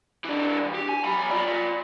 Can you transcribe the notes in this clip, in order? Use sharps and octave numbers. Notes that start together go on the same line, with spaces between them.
E3 D4
G4
G#5
F#3 B5
F4 D5